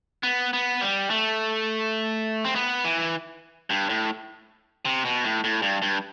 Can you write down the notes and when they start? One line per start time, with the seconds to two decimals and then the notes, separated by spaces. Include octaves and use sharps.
0.23 B3
0.53 B3
0.81 G3
1.10 A3
2.45 C4
2.55 B3
2.84 E3
3.70 G2
3.89 A2
4.85 C3
5.05 B2
5.24 A2
5.44 A2
5.62 G2
5.82 G2